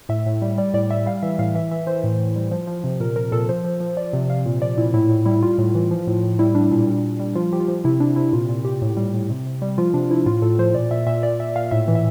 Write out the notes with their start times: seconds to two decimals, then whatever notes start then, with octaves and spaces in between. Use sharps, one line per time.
0.09 A2 E5
0.26 A2
0.42 G3
0.58 G3 D5
0.74 A2 D5
0.90 G3 E5
1.06 G3 F5
1.23 E3 E5
1.39 A2 F5
1.55 E3 E5
1.71 E3 E5
1.87 E3 C5
2.04 A2
2.20 A2
2.36 G3
2.51 F3
2.67 F3
2.84 C3
3.00 A#2 A#4
3.16 F3 A#4
3.32 A#2 A4
3.49 F3 C5
3.64 F3
3.80 F3
3.97 F3 D5
4.13 C3
4.30 C3 F5
4.46 A#2
4.62 F3 D5
4.78 A#2 E4
4.94 A2 E4
5.09 A2 E4
5.25 G3 E4
5.42 G3 F4
5.58 A2
5.75 E3
5.91 F3
6.07 A2
6.23 A2
6.39 G3 E4
6.55 G3 D4
6.71 A#2 D4
6.87 G3
7.03 A#2
7.20 G3
7.35 F3 F4
7.52 F3 G4
7.60 F4
7.68 F3
7.85 C3 E4
8.00 C3 D4
8.16 C3 E4
8.33 A#2 F4
8.49 A#2 F4
8.65 A#2 G4
8.82 A2
8.97 G3
9.14 A2
9.30 C3
9.46 C3
9.62 G3
9.78 F3 F4
9.94 C3 D4
10.10 F3 E4
10.26 A2 F4
10.42 A2 A4
10.59 F3 C5
10.74 A#2 D5
10.91 A#2 E5
11.07 A#2 E5
11.23 A#2 D5
11.39 A#2 E5
11.55 A#2 F5
11.71 A2 E5
11.88 E3
11.95 E5